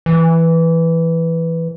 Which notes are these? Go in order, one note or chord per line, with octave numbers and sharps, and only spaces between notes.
E3